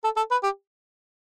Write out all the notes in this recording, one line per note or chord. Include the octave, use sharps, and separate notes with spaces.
A4
A4
B4
G4